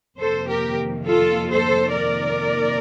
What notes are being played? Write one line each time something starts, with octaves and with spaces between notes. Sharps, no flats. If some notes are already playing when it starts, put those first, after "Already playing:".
F2 C3 D#3 A#3 A4 C5
G4 A#4
F4 A4
A4 C5
A#4 D5